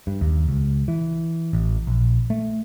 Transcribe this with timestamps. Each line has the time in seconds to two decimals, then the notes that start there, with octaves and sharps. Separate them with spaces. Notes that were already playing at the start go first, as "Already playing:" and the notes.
0.07 G2
0.21 D#2
0.49 C#2
0.88 E3
1.53 A1
1.87 A#1
2.30 A3